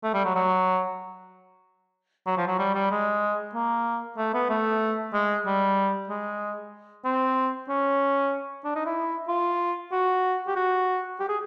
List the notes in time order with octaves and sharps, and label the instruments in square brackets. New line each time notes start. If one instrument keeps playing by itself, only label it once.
[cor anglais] A3
G3
F#3
F#3
F#3
F3
F#3
G3
G3
G#3
A#3
A3
B3
A3
G#3
G3
G#3
C4
C#4
D4
D#4
E4
F4
F#4
G4
F#4
G4
G#4